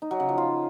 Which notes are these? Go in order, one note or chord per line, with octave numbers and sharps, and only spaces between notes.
D#4
F#3
C#3
F3
F4